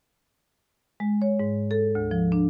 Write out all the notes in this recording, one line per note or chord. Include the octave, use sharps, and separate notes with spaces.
G#3
C#5
G#2
A4
D2
F3
D4